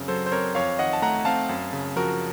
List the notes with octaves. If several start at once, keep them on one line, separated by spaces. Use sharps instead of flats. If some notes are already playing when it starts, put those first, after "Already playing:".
Already playing: F#2 C#3 C4
F#3 A4 C5
C5
C4 A#4 C#5
F2 C#5 F5
D#3 D#5 F#5
A5
A3 F#5 A#5
C4 F5 A5
F#2
C#3
F3 F#4 A#4